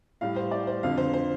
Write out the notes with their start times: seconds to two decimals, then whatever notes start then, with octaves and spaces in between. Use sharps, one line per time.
0.21 A2 G3 F5
0.36 C5
0.51 D5
0.67 C5
0.83 F2 D3 F3 F5
0.98 C5
1.14 C5